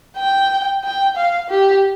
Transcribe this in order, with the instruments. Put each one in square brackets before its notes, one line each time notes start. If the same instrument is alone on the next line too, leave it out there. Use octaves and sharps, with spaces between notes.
[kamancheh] G5
G5
F5
G4